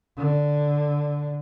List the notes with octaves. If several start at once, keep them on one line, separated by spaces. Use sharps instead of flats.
D3